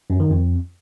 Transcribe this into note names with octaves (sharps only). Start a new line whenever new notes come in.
F#2
D#3
F2